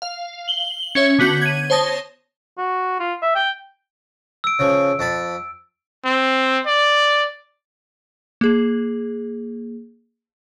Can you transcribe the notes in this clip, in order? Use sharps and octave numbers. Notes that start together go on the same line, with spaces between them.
F5
F#7 G7
C#4 C#5 E5
D3 B3 F#4 G6
G#6 D#7
C5 C#5 A5 D#6 A#6
F#4
F4
E5
G5
E6 D7
C#3 F3
F2 A5 B5
C4
D5
A#3 G#4